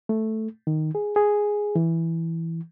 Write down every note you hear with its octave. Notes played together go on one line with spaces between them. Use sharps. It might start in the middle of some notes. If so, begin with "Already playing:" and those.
A3
D#3
G#4
G#4
E3